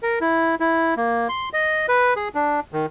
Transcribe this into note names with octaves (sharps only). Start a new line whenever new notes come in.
A#4
E4
E4
A#3
C6
D#5
B4
G#4
D4
D#3